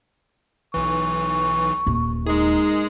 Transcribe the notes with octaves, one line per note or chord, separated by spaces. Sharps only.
B1 E3 C#6
D#1
G#3 D#4 G#4 A#4